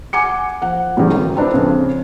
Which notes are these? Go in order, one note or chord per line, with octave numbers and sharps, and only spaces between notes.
F#5 G#5 D6 C#7
F3 F#5
E2 G#2 C#3 G3 G#3
G#1
C4 D4 E4 B4 C5
F2 C#3